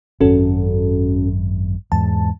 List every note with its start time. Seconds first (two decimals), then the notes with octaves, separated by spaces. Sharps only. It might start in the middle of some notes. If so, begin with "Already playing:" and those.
0.21 G#1 F#2 C#4 F#4 A4
1.92 E2 G#2 A5